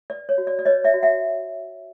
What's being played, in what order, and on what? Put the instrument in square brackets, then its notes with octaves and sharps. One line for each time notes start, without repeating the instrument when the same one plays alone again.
[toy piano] B4 D5
C#5
F#4
D5
D5
B4 C#5 D#5
D5 E5
F#4
E5 F#5